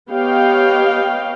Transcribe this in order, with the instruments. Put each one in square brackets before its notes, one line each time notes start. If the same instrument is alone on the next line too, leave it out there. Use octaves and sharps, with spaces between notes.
[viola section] B3 G4 C#5 D#5 F5 G5